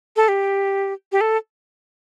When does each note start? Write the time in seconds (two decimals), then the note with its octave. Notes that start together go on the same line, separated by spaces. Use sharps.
0.16 A4
0.28 G4
1.12 G4
1.21 A4